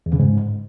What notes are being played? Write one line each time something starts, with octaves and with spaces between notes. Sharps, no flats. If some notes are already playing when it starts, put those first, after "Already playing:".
E2
C#3
G#2